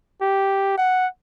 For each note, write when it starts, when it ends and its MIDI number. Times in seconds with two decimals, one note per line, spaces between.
0.21 0.75 67
0.77 1.07 78